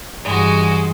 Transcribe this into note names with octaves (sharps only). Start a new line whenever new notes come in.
G2 E3 G#3 F#4